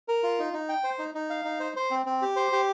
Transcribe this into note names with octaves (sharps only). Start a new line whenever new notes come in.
A#4
F4
D#4
D#4
G5
C5
D#4
D#4
F5
D#4
C5
C5
C4
C4
G4
C5
G4